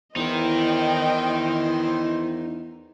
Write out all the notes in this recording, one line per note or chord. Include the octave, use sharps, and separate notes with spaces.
E2 E3 D#4 A#4 C5 D#5 G5